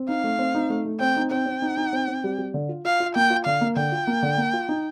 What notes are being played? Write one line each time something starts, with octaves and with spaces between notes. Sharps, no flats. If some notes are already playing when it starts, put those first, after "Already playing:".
Already playing: C4
D#4 F5
A3
C4
D#4
A3
A3
C4 G5
D#4
C4 G5
C4
D#4
D#4
C4
C4
G3
G3
D3
F4
F4 F5
F4
A#3 G5
F4
D3 F5
A#3
D3 G5
F4
A#3
D3
A#3
F4
D#4